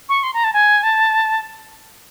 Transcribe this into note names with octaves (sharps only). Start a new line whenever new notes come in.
C#6
C6
A#5
A5
G#5
A5